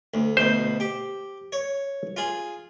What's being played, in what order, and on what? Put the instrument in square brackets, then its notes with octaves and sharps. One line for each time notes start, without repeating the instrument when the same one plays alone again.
[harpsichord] D2
[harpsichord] D2 B2 [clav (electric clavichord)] C5
[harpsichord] G4
C#5
F4 G#4